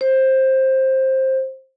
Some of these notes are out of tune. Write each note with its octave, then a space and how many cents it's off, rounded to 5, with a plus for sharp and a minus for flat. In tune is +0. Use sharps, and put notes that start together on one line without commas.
C5 +15